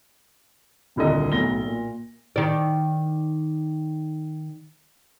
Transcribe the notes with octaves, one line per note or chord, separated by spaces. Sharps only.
D#1 C2 D3 D#5
B1 A2 A#6 G7
A#2
D#3 D5